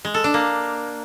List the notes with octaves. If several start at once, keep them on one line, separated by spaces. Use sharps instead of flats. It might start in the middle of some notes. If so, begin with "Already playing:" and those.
G#3
A4
D4
A#3